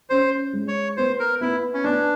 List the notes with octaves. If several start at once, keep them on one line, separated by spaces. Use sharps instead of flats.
C#4 C5
G#3
C#5
B3 C5
A#4
B3 E4
C#4
B3 D4